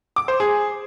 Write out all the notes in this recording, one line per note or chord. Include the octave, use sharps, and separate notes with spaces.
D6
C5
G#4